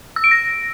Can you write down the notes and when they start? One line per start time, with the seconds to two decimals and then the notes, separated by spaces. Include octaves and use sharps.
0.16 E6
0.24 D7
0.31 A#6